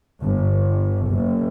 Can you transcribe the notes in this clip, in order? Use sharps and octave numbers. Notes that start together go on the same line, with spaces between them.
G1
F#1